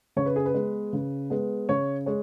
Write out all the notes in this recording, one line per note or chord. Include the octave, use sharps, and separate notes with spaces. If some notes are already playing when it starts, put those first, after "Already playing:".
C#3 C#5
B4
G#4
B4
G#3 B3
C#3
G#3 B3
C#3 C#5
G#3 C#5